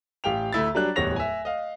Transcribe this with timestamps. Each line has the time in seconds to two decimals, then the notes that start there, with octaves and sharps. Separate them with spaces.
0.24 A1 G4 F5 G5 F7
0.53 D2 A3 E4 A6
0.75 F#3 G3 D4 F#6
0.96 D1 E2 G3 C#5 A#6 F7
1.16 E5 G#5
1.45 D#5 F5